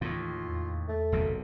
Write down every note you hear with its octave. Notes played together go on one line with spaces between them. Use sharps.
D#2 A2 E3 F4
E2
A3
F#1 B1 C3